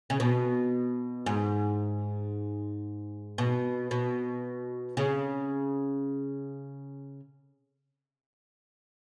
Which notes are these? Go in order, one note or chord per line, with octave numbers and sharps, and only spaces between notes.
C#3
B2
G#2
B2
B2
C#3